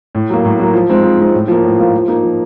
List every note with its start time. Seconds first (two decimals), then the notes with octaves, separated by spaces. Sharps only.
0.15 A2
0.30 F#3 A#3
0.45 A2
0.60 F#3 A#3
0.74 F3
0.89 G#3 C4 D#4
1.03 F3
1.20 G#3 C4 D#4
1.34 A2
1.48 F3 A#3
1.63 A2
1.79 F3 A#3
1.94 F3
2.08 A#3 D#4
2.23 F3